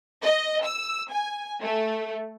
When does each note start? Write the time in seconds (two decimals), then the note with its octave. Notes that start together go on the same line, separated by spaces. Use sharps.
0.23 D#5
0.65 E6
1.10 G#5
1.61 A3